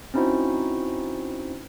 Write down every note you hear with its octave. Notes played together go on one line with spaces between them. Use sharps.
C4 C#4 D#4 E4 F#4 C5